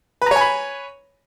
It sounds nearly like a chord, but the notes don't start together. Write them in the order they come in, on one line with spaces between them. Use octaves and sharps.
B4 A#5 C#5 G#5 B5